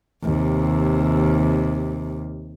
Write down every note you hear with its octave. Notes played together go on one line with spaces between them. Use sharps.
D#2 C3